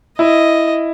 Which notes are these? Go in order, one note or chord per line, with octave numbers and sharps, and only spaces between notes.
E4 D#5